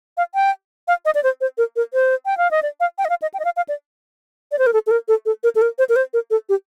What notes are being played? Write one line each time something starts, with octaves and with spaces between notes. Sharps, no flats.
F5
G5
F5
D#5
D5
C5
C5
A#4
A#4
C5
G5
F5
D#5
D5
F5
G5
D#5
F5
D#5
G5
D#5
F5
F5
D5
D5
C5
A#4
A4
A4
A#4
A4
A4
A#4
A4
A#4
C5
A#4
C5
A#4
A4
G4